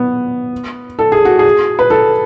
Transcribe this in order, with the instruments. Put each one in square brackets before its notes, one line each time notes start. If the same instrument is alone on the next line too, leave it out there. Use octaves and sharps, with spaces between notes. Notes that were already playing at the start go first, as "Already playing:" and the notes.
Already playing: [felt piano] B3
A4
G#4
F#4
G#4
B4
A4